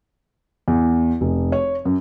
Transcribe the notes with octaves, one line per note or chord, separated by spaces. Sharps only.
E2
F1
C#5
F#2